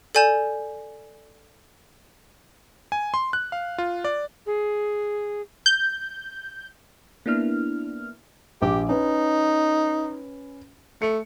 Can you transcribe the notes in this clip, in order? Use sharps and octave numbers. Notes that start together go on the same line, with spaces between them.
A4 D5 G#5 G6 E7
G#5
C6
F#6
F5
F4
D5
G#4
G6
A#3 B3 D4 E4 F6
A#1 G4 D6
C#4 D#4 B4
A3 C#7